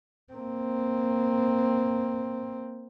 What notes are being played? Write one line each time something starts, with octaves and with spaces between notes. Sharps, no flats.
A#3 C4